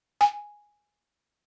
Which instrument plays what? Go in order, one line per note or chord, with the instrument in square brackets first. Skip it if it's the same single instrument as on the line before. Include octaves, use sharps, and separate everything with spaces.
[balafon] G#5